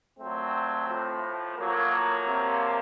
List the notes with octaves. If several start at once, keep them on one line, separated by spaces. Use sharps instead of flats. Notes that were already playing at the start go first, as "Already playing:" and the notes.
A#2 F#3 A3 C4
A2 F3
A2 F3 F#3 A#3
C3 F3